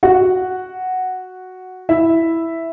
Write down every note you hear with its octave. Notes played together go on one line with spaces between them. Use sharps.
F#4 F#5
E4 E5